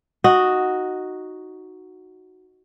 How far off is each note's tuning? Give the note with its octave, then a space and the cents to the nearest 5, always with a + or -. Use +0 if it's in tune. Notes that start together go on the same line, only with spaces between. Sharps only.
D#4 +0 F#4 +0 D#5 +0